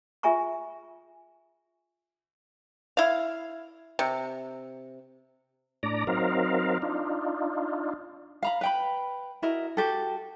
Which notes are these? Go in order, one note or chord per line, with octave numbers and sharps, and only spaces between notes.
F4 G#4 E5 G#5 A#5 C#6
E4 F5
C3
A2 D4 D5 A#5
F#3 C4 D#4 A#4 F5
D4 D#4 F4
F5 A#5 B5
B4 G5 B5
E4 F#4 A#4 D#5
F#4 G4 A4